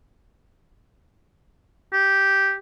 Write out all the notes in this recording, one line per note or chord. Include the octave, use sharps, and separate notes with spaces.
G4